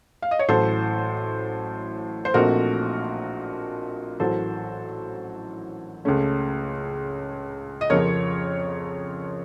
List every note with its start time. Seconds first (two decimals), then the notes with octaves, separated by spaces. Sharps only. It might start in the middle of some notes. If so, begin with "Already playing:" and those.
0.22 F5
0.31 D#5
0.39 C#5
0.48 A1 A2 F#3 A4 C5
2.25 C5
2.34 A#1 A#2 A3 C4 D#4 F#4 A#4
4.20 A1 A2 F#3 A4 C5
6.05 C#2 C#3 A3 C#4
7.81 D#5
7.90 F2 C#3 F3 A#4 C#5